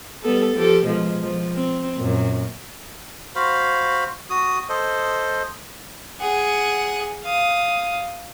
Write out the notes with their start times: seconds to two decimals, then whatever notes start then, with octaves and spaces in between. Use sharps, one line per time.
0.23 G3 B3 A4
0.55 F3 G4 A4
0.85 B2 F3 G#3
1.22 F3
1.56 C4
1.96 F#2 A#2
3.36 F#4 C5 F5 B5
4.30 F#4 D#6
4.69 A4 C5 D#5
6.21 G#4 F#5
7.24 F5 D#6